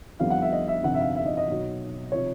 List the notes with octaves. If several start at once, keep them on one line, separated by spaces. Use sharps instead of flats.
F2 D3 G3 B3 F5
F#5
E5
D#5
E5
G1 F2 C3 F#5
E5
F5
E5
D#5
D#5
B1 B2 F#3
C3 F3 C#5